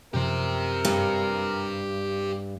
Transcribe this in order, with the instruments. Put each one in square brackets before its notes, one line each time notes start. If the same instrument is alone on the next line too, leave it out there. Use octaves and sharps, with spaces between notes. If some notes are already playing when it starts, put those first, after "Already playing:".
[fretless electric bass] F#2 C3 F3 [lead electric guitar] G4 C5 [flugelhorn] A#4
[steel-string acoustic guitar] G2